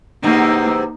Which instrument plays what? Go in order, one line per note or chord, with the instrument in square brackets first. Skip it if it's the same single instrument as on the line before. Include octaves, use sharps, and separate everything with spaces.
[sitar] E2 G#2 C3 [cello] A#3 D#4